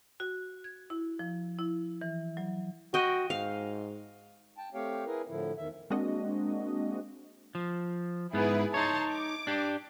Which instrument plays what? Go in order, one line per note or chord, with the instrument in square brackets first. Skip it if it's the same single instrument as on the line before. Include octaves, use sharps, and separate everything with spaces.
[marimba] F#4
G#6
E4
F3
E4
E3
F#3
[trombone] F#4 [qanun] D#5 G5
[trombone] G#2 [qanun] F5
[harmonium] G5 A5
A3 C4 G4 C#5 F5 G5
E4 G#4 A#4 B4
A2 D3 F3 E4
E2 D#3 E5
[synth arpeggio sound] G#3 A#3 C4 D4 F#4 D#5
[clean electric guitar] F3
[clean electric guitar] G#2 B3 [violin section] E4 G#4 B4
[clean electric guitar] D#4 C#5 [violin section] A5 A#5 C6
[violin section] D6
[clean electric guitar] D4 G4